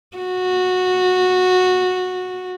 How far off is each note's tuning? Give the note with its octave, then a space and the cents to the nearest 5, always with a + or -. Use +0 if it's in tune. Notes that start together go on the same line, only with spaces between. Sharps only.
F#4 -15